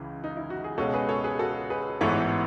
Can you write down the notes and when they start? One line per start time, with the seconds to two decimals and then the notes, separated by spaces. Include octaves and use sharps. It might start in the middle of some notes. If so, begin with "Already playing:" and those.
Already playing: C#2 C#3 E3
0.24 D#4
0.37 E4
0.50 F#4
0.64 G#4
0.77 C#2 B2 G#3 C#4 F#4 A4
0.94 G#4 B4
1.09 A4 C#5
1.24 G#4 B4
1.39 F#4 A4
1.70 G#4 B4
2.01 A1 G#2 E3 B3 E4 A4 C#5